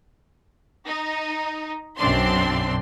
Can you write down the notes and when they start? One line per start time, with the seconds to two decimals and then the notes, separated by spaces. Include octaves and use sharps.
0.86 D#4
1.97 B1 F#2 C4 D4 C6